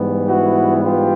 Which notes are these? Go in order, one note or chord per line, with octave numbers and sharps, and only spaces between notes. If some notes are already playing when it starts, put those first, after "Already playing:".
Already playing: G#2 E3 G3 B3
E4 F#4
F4 G4